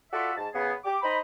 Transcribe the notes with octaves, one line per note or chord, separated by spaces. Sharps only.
F4 F#4 A4 D5 E5
G#2 A5
C#3 B3 G#4
G4 D6
D#4 C5 D#5 B5